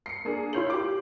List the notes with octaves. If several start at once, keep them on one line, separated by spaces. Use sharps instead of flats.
C7 C#7
A#3 D4 G#4
E4 F4 C#5 G6 C7 F#7
G4 D6